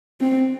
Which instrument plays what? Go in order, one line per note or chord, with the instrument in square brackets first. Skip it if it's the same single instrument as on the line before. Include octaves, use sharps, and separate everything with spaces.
[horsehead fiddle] C4